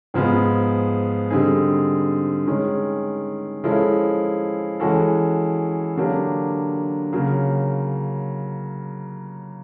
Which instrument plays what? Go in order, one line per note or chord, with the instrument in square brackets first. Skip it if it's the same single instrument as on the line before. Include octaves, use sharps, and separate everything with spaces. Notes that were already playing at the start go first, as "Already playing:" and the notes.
[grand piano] G#2 F3 G#3 B3
D3 G3 C4 D#4 G#4
D#3 G#3 C#4
F3 G#3 C#4 E4 A4
E3 G#3 C#4 F#4 A4
D3 F#3 A#3 D4 G4
C#3 F#3 A#3